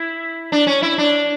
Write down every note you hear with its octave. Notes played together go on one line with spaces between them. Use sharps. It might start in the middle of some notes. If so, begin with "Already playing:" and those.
Already playing: E4
D4
C#4
E4
D4